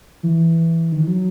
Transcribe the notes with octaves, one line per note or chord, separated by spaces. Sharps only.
E3
D#3
E3
F#3